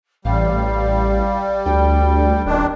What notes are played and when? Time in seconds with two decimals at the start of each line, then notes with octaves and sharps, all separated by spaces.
0.25 A1 G3 F5
1.66 D2 G5
2.46 D#1 D#3 D4